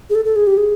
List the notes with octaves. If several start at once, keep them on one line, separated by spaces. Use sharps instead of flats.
G#4
A4
A4
G#4
G4
G#4